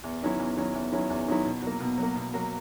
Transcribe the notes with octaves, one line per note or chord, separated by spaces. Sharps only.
E2
D#3 F#3 C#4 E4
E2
D#3 F#3 C#4 E4
E2
D#3 F#3 C#4 E4
E2
D#3 F#3 C#4 E4
B2
F#3 A#3
B2
F#3 A#3
B2
F#3 A#3